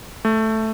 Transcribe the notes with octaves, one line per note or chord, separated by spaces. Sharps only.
A3